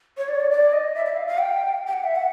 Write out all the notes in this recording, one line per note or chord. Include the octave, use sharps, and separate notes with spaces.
C#5
D5
C#5
D5
D5
D#5
E5
E5
F5
F5
G5
G5
F#5
E5
F#5